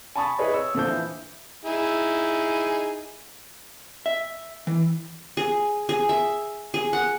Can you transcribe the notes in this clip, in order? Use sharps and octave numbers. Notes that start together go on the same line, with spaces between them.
G#5 A5 B5 C#6 D#6 A6
E4 G#4 B4 C#5 D#5
C#5 E6
A#2 D3 F3 G6
E3
D#4 E4 G#4
E5
E3
G#4
G#4
E5
G#4
F#5